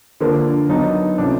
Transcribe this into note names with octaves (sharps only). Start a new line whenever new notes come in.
D3 F3 A#3 D4
D#3 F#3 B3 D4 D#4
C3 F3 A3 C#4 D4